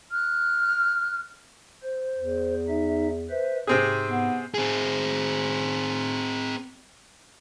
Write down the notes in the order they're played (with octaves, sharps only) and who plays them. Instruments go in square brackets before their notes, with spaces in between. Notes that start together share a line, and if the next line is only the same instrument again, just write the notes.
[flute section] F6 F#6
[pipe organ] C5
[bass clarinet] E2
[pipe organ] D#4 E5
B4 C5 E5
[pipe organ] G#2 [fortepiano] C3 C4 G#4
[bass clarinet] B3
[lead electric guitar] C4 G#4